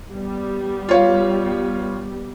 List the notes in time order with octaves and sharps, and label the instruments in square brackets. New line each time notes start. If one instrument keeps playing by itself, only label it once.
[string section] G3 B3
[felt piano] F4 C#5 F5